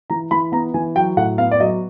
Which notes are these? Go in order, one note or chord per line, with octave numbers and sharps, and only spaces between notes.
E3 A#5
E3 B5
B3 A#5
E3 G#5
F#3 G5
A2 F#5
B3 F5
D5
F#3 D#5